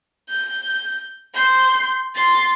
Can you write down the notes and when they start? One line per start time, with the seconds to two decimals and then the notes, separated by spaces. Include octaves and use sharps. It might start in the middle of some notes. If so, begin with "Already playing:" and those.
0.30 G6
1.34 C6 G6
2.15 C6 A6